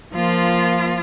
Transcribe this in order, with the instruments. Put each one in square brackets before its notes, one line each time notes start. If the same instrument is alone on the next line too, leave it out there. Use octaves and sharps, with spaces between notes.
[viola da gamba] F3 [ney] A#3 [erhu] F4